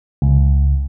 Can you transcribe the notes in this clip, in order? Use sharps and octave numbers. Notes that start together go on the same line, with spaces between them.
C#2